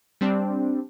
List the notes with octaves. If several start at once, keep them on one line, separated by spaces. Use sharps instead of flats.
G3 C4 D4